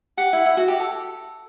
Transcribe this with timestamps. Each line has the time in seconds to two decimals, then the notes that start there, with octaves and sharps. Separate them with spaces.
0.17 G4 F#5
0.33 E4
0.46 E4
0.57 F#4
0.68 G4
0.80 A4